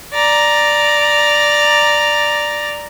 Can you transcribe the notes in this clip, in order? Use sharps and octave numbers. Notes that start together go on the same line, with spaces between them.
D5 A#5